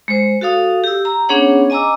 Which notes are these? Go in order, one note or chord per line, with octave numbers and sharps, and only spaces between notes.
G#3 C5
F#4 A4 F5 D#6
G4 E6
A#5
B3 C#4 D4 G#4 C#5 F#5
D#5 G#5 A#5 D6 E6